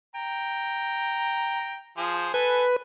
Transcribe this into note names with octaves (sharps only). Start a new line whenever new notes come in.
G5 A#5
F3 G#4 C5
A4 B4 G#5